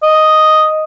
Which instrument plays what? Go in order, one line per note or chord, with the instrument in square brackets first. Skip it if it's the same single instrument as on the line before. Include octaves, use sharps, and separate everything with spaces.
[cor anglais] D#5